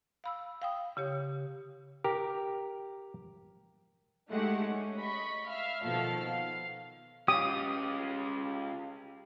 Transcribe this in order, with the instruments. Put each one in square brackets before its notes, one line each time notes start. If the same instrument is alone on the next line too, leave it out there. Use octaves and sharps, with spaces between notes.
[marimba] F5 B5 E6
F5 G5 D#6
C#3 G4 C#5
[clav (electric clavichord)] G4 A#4
[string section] G#3 A3 D#4 G4 F#5
C#4
D#5 B5 C#6
E5 F5 F6
B2 D#3 F3 A4 F5 F6
F5
[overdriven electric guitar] C#4 F4 [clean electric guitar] G4 [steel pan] D#6